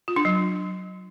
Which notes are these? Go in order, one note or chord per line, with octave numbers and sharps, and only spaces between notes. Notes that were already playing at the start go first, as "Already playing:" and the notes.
F4
D4
F#3